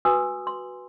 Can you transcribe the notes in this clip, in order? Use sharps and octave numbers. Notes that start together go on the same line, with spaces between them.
F#4 B4 G#5 D#6 E6
C6